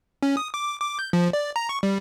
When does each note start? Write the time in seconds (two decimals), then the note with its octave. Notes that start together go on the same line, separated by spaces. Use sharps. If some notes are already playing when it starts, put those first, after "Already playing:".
0.23 C#4
0.37 D#6
0.54 D6
0.81 D6
0.99 G6
1.13 F3
1.33 D5
1.56 A#5
1.69 C#6
1.83 G3